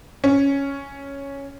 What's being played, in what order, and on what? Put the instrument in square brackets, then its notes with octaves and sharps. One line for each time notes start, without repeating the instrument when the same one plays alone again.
[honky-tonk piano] C#4